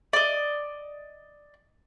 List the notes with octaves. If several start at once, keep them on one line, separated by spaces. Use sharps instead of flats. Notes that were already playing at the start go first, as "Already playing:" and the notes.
D5 D#5